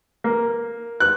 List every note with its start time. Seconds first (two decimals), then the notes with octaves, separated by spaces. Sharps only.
0.24 A#3
1.00 F#6